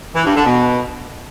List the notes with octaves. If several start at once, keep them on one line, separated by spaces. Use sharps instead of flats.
E3
G2
D3
B2